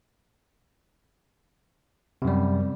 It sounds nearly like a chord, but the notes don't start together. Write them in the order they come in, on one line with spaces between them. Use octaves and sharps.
C3 F#2 G3